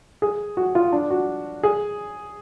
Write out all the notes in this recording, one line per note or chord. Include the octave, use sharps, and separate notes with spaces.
G#4
F#4
F4
D4
F#4
G#4